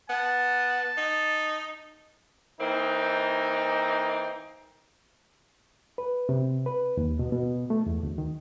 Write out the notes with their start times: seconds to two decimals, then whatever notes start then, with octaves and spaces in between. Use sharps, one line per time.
0.10 B3 A5
0.97 D#4
2.60 E3 A#3 C4 D#4
5.98 B4
6.29 C3
6.66 B4
6.97 D#2
7.19 B2
7.32 B2
7.70 A3
7.86 E2
8.03 D2
8.18 D#3